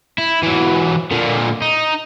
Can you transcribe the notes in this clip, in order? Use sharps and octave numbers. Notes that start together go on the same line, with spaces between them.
E4
E3 F#3
A#2 D3
D#4